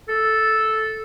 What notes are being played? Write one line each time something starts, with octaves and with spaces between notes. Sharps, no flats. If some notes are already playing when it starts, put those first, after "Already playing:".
A4